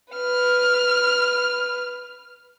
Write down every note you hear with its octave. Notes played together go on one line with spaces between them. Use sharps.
B4 F6